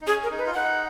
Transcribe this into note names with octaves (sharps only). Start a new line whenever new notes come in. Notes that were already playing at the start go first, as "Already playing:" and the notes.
D#4
C#4 G#4
A#4
D#4
B4
F4
D#4 F#5